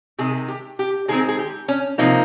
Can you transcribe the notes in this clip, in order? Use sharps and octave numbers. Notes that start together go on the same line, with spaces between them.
C3 D#3 G#3 G#4
G4
G4
D#3 G#3 C4 G#4
G#4
G4
C#4
C3 F3 A#3 D#4